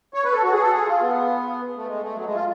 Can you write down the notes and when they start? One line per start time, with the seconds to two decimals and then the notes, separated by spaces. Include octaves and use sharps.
0.14 C#5
0.24 B4
0.33 A4
0.43 F#4
0.52 G#4
0.62 A4
0.72 G#4
0.87 F4
1.01 B3
1.76 A3
1.87 G#3
2.02 A3
2.15 F#3
2.26 G#3
2.35 F4